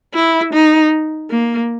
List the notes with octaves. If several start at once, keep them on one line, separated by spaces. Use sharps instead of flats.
E4
D#4
A#3